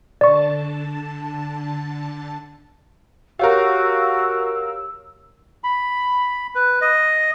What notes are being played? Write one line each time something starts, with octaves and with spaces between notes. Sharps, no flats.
D3 D5 A5 C#6
F#4 G4 A#4 C#5 F5 E6
B5
B4
D#5